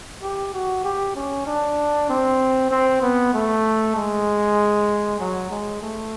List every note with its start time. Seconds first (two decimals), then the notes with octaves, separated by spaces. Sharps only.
0.22 G4
0.54 F#4
0.84 G4
1.15 C#4
1.46 D4
2.09 C4
2.71 C4
3.02 B3
3.34 A3
3.96 G#3
5.20 F#3
5.50 G#3
5.82 A3